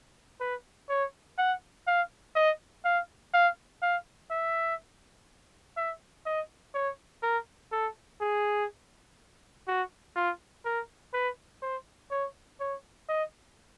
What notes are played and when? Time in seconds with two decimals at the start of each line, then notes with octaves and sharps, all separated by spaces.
0.40 B4
0.89 C#5
1.38 F#5
1.87 F5
2.36 D#5
2.85 F5
3.34 F5
3.82 F5
4.31 E5
5.77 E5
6.26 D#5
6.75 C#5
7.23 A#4
7.72 A4
8.21 G#4
9.68 F#4
10.16 F4
10.65 A#4
11.14 B4
11.62 C5
12.11 C#5
12.60 C#5
13.09 D#5